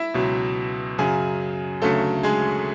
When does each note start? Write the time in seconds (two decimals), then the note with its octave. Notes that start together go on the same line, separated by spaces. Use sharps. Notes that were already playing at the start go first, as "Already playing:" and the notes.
Already playing: E4 E5
0.14 C#2 B2 F#3
0.98 F#2 C#3 F#3 G#4 G#5
1.82 D2 C#3 F#3 A3 A4
2.23 G#3 G#4